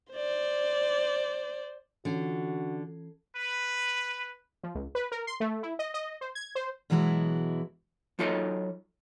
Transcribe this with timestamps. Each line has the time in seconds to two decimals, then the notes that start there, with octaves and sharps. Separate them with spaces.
0.12 C5 D5
2.05 D3 E3 C#4 F4 F#4
3.37 B4
4.63 F3
4.75 C#2
4.95 B4
5.12 A#4
5.27 C6
5.40 A3
5.63 E4
5.79 D#5
5.94 D#5
6.21 C5
6.35 G#6
6.55 C5
6.90 B2 E3 F#3 G#3 E4 F#4
8.19 F#3 D#4 F4 A4 C#5 D#5